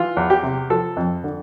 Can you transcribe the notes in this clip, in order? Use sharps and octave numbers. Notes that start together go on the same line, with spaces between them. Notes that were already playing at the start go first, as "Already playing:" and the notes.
Already playing: E3 F4
E2
G4
C3
F3 A4
F2
D3